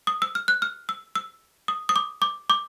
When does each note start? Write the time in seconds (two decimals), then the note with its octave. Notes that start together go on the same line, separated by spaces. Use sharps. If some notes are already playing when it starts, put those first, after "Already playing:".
0.07 D#6
0.22 E6
0.35 F6
0.48 F#6
0.62 F6
0.89 E6
1.15 E6
1.68 D#6
1.89 D#6
1.96 D6
2.22 D6
2.50 D6